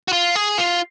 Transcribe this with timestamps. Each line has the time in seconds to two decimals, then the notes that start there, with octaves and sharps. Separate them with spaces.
0.08 F#4
0.13 F4
0.36 G#4
0.58 F4